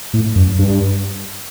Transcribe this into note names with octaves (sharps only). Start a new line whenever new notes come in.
A2
F#2
G2